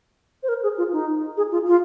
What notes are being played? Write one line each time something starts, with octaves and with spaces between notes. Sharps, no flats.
C5
A#4
G#4
F4
D#4
G#4
F4
F4